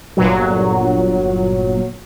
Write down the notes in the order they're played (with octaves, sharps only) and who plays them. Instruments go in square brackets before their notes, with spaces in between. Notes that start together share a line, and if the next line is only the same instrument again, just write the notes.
[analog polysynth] G1 A#2 F#3